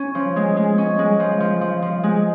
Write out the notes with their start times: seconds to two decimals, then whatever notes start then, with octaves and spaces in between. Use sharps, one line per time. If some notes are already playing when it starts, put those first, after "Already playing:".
Already playing: C#4
0.15 F3
0.36 G#3
0.57 G#3
0.78 C#4
0.99 G#3
1.20 F3
1.40 F3
1.61 F3
1.82 F3
2.04 G#3